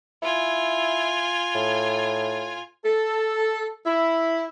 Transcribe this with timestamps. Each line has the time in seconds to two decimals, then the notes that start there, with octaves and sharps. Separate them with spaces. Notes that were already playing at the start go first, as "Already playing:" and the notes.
0.23 E4 F4 G#5
1.55 A2
2.84 A4
3.86 E4